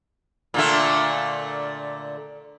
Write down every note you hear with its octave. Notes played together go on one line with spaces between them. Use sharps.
A#2 D3 A3